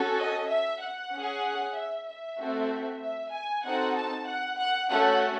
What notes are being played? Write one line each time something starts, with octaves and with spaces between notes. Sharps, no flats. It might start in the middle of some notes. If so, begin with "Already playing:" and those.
Already playing: C#4 F#4 A4
D#5
E5
F#5
C#4 G#4
E5
E5
A3 C4 F#4 A4
E5
G#5
C4 D#4 F#4 A4 F#5
A5
F#5
F#5
A3 C#4 F#4 A4 F#5